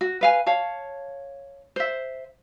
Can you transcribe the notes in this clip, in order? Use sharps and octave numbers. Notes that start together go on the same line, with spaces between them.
F#4
B4 F5 G#5
C#5 F5 A5
C5 E5